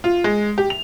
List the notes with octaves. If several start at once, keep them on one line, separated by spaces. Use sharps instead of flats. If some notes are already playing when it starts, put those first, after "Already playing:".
F4
G#3
G4
F7